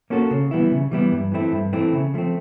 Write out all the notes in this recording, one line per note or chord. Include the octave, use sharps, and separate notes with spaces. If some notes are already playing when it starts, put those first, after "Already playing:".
A#3 C#4 F#4 A4
C#3
E3 G3 B3 E4
C#3
E3 G3 B3 E4
G2
E3 A3 C4 E4
G2
E3 A3 C4 E4
C#3
F3 A3 C4